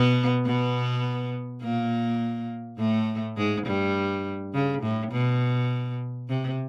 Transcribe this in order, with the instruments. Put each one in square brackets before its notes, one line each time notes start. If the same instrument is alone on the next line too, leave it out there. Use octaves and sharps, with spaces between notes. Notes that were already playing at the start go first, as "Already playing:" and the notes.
Already playing: [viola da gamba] B2 B3
B2 B3
A#2 A#3
A2 A3
G#2 G#3
G2 G3
C#3
A2
B2
C3